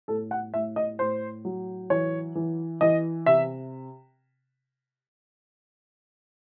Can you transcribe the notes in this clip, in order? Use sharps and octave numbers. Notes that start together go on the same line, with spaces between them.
A2 A4
F#5
A2 E5
D#5
A2 C5
F#3
E3 C#5
E3
E3 D#5
C3 E5